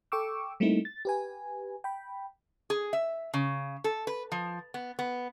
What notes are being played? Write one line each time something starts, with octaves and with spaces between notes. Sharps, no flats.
A4 G5 C#6 D6 E6
G3 A3 A#3 C4 D#4 E4
A6
G4 B4 G#5
G5 B5
G#4
E5
C#3
A4
B4
F3
B3
B3